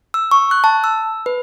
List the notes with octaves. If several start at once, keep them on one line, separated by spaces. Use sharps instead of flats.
E6
C#6
F#6
A5
E6
B4